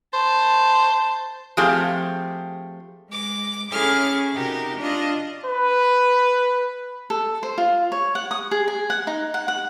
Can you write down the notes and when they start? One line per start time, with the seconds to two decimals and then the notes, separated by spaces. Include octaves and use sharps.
0.14 C5 A5
1.57 F3 A3 C4 G4 G#4 F5
3.10 G#3 D6
3.70 C#4 E4 G#4 A4 D6 F6
4.33 C3 D#4 F#4 G4 A#4
4.78 D4 F4 D#5
5.46 B4
7.10 A4
7.43 C5
7.58 F4
7.92 C#5
8.15 F#5
8.31 D#6
8.51 G#4
8.68 G#5
8.90 F#5
9.07 D#4
9.34 F#5
9.48 F#5